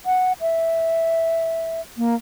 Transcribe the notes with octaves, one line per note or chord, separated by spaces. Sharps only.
F#5
E5
A#3